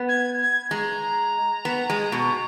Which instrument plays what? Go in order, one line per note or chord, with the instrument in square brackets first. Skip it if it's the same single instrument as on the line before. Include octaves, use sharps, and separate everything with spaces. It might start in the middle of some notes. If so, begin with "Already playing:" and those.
Already playing: [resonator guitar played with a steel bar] B3
[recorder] G#6
G#6
[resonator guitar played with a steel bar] G#3 [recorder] A#5
[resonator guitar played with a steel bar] B3
G#3
B2